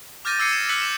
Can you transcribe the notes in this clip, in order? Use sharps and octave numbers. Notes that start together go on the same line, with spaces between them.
D6 F6 G6 A6 A#6 D#7
D6 E6 G#6 C7 C#7 D#7
E7
E6 F#6 A#6 B6 C#7 F#7
E7